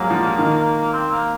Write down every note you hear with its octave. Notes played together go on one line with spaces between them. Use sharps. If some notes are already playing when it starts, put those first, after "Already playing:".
Already playing: F#3 G#3 A#3
F3
D#3
C4
A#3